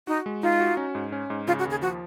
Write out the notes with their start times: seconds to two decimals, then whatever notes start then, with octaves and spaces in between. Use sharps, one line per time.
0.07 D#4 F#4
0.26 G#3
0.43 D#4 F4
0.60 F#4
0.77 C#4
0.95 G#2
1.12 C#4
1.30 G#2
1.47 C#3 F4
1.59 F#4
1.65 D#2
1.70 G#4
1.82 F3 F#4